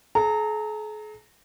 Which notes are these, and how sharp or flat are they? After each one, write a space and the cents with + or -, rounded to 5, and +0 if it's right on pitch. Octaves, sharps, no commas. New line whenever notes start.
G#4 +45 A#5 -20